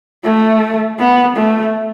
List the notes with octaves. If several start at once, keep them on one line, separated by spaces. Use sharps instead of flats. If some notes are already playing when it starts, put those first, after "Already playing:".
A3
B3
A3